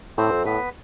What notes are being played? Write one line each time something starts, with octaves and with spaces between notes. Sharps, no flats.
A2 C4 C5
F2
A2 B3 B4